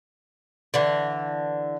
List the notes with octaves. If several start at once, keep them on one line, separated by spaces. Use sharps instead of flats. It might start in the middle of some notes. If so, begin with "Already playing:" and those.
D3 E3